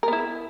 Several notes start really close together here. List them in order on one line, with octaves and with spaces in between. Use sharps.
A#4 B3 E4